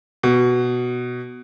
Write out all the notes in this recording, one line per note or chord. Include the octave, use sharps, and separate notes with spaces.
B2